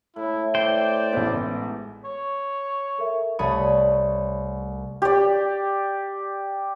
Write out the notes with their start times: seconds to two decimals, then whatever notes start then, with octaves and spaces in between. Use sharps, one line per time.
0.16 A2 E4
0.55 C5 D5 G5
1.13 A1 G#2 B3
2.04 C#5
2.98 A4 A#4 E5
3.39 C2 A3 C#5 B5 D#6
5.02 G4 D5